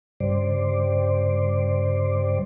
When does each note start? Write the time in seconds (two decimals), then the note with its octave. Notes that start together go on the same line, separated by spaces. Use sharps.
0.20 G2 C#3 G3 C5 D5